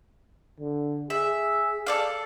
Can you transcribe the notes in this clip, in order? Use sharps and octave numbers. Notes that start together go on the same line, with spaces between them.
D3
G#4 E5
A4 D5 F5